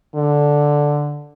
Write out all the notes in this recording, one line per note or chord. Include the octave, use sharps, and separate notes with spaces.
D3